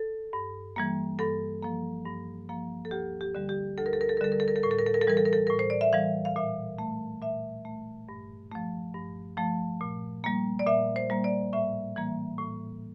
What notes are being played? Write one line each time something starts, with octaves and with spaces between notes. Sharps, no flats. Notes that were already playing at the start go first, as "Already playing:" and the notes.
Already playing: A4
G2
E3 G3 A#3
G2 A4
F3 A#3
G2
F3 A#3
A4
D2 G4
G4
D3 G3
G4
D2 A4
A#4
A4
A#4
A4
A#4
D3 G3 A4
A#4
A4
A#4
A4
A2 A#4
A4
A#4
A4
A#4
A4
E3 G3 A#4
A4
A#4
A4
A2 A#4
C5
D5
E5
E3 G3 F5
F5
A#2 E5
A3
A#2 E5
A3
G2
F3 A3
G2
F3 A3
A#2
G3 A#3
D5
A#2 E5
C5
G3 A#3
D5
A2 E5
E3 G3 A#3
A2